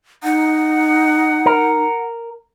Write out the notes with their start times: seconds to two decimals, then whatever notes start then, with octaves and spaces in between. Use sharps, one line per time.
0.24 D#4 F#5
1.46 A#4